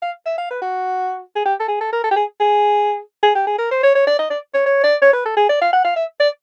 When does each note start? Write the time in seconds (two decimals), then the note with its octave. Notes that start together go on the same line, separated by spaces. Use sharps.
0.02 F5
0.26 E5
0.38 F5
0.51 B4
0.62 F#4
1.36 G#4
1.46 G4
1.60 A4
1.68 G#4
1.81 A4
1.93 A#4
2.04 A4
2.11 G4
2.16 G#4
2.40 G#4
3.23 G#4
3.35 G4
3.47 G#4
3.58 A#4
3.71 C5
3.83 C#5
3.95 C#5
4.07 D5
4.19 D#5
4.30 D5
4.54 C#5
4.66 C#5
4.84 D5
5.02 C#5
5.13 B4
5.26 A4
5.37 G#4
5.49 D5
5.61 F5
5.73 F#5
5.85 F5
5.96 E5
6.20 D5